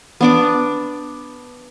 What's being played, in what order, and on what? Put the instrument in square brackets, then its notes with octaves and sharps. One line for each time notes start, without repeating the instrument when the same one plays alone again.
[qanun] B3 D4 D6